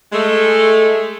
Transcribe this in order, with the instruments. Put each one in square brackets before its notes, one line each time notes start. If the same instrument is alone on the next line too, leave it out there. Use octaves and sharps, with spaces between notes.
[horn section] G#3 A3